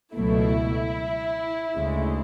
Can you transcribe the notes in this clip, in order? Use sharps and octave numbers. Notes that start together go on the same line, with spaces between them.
C#2 B2 F#3 A3 E4
D2 C#3 G#3